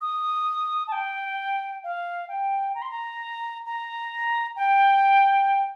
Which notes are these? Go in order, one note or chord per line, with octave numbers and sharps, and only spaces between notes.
D#6
A5
G5
F5
G5
A#5
C6
A#5
A#5
G5